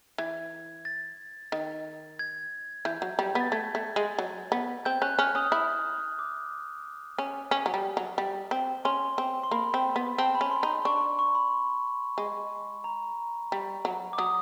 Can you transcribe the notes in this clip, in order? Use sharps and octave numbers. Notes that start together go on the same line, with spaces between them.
E3 G#6
A6
D#3
G#6
E3 G6
F#3
G3
B3
A6
A3 G#6
A3
G#3
F#3
B3
C4 G6
C#4 F#6
C#4 F6
C#4 D#6
E4
D6
C#4
C#4
F#3
G3
F#3
G3
C4
C#4 C6
C4
C6
A#3 B5
C4
B3
C4 A5
B5
C#4
C6
D#4
D4 C#6
C#6
B5
G#3
A#5
G3
F#3
D6
F#3 D#6